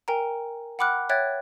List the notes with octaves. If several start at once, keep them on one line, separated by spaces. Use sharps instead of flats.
A#4 G5 G#5 A#5
F#5 G5 B5 D6 F6 F#6
C#5 E5 G5 F#6 G#6 A6